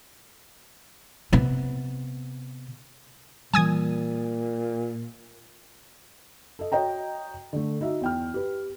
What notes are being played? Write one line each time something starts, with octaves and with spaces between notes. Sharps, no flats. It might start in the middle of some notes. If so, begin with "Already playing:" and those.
C3 B3
A#2 E3 G3 G#5 D#6 G#6
A4 D#5
F#4 C#5 D#5 G5 A#5
D3 A3
D#4 F#4 E5
E2 G5 F6
G4 B4